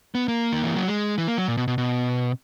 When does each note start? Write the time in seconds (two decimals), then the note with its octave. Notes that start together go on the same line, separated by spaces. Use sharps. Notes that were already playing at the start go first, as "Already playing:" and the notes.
0.15 B3
0.28 A#3
0.52 D#3
0.64 E3
0.76 F#3
0.88 G#3
1.18 E3
1.28 A#3
1.38 F#3
1.48 A#2
1.57 B2
1.68 B2
1.78 B2